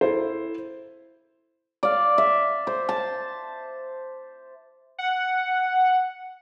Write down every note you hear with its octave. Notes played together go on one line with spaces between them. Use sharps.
E4 A4 C5
D5 F5
E5
C5
A5
F#5